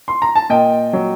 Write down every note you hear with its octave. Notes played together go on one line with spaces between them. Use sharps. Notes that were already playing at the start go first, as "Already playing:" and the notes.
C6
A#5
A5
A#2 D#5 G5
F#3